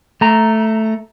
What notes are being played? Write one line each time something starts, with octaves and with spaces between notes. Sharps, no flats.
A3 A#5